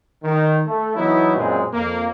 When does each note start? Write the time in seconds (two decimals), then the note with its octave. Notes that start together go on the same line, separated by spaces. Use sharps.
0.23 D#3
0.66 A3
0.96 E3 F#3 B3 D#4 E4
1.36 F#2 A#2 G#3 C4
1.72 F2 A#3